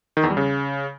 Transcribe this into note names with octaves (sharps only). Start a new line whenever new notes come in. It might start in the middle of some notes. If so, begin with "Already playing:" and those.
D#3
E2
G3
C#3